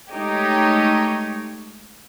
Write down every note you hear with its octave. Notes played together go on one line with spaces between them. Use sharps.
G#3 A3 D#4 G4 C#5